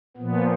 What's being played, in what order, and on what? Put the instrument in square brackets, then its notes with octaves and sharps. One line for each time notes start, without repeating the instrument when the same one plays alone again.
[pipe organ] A#2 F3 B3